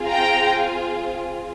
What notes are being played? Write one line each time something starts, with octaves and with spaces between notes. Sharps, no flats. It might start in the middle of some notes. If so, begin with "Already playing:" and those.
Already playing: C4 F4 G#4
G5 A#5